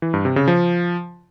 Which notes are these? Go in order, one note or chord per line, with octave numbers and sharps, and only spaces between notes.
E3
G2
C3
C#3
F3